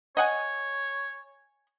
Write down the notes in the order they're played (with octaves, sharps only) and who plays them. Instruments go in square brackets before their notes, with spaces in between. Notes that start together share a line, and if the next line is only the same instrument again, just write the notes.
[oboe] C#5 [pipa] D#5 F#5 G#5